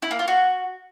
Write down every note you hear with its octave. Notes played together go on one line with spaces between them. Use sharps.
E4
A#3
F4
F#4